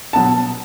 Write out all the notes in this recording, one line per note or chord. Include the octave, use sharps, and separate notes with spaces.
B2 F#3 A5